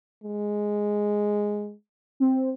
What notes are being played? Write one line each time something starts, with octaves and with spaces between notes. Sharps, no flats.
G#3
C4